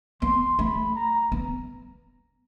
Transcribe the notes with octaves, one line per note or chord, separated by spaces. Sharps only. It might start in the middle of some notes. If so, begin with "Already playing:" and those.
B3 C6
A3 B5
A#5
B3